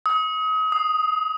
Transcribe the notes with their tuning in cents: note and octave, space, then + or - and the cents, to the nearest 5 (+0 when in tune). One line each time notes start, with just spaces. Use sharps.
D#6 +35
D#6 +5